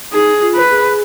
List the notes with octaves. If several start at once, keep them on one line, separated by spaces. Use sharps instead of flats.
D#4 G#4
F4
B4
G#4